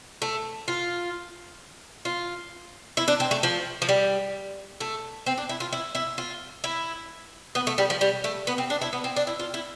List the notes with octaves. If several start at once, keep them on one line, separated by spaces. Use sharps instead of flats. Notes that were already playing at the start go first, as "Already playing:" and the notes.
A3
F4
F4
E4
D4
C4
A3
F3
F3
G3
A3
C4
D4
E4
F4
E4
E4
F4
E4
B3
A3
G3
F3
G3
A3
B3
C4
D4
E4
B3
C4
D4
E4
F4
E4